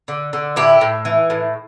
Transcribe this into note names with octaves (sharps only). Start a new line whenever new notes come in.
D3
D3
A2 E4 G4
A2
E3
A2